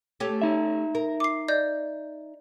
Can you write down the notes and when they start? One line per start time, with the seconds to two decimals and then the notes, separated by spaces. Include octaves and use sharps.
0.20 A3 C#4 G4
0.42 D#4 E5
0.95 A#4
1.20 D6 C7
1.48 D5 D#5 G6